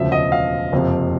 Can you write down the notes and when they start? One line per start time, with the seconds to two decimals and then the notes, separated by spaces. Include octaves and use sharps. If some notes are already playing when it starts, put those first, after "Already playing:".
Already playing: E1 D2 C#3 F3 E5
0.12 D#5
0.32 F5
0.72 F#1 F2 C3 F3